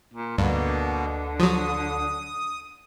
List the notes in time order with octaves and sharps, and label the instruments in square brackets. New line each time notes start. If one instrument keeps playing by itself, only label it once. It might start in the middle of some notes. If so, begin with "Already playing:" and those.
[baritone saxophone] A#2
[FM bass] D2 [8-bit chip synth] G2 [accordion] B2 A#3 B3 [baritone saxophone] D3
[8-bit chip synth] F3 F#3 [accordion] D#6